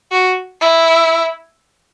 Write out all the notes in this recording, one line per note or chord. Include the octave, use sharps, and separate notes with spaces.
F#4
E4